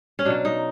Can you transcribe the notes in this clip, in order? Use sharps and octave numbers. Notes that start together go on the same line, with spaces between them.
C#4
B2 F#3 D4
D#4